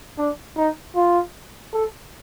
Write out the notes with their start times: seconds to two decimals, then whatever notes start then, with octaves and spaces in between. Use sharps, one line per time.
0.18 D4
0.56 D#4
0.95 F4
1.73 A4